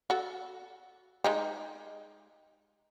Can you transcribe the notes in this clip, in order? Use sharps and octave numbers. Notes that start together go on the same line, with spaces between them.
F#4 A4
G#3 D#4 G4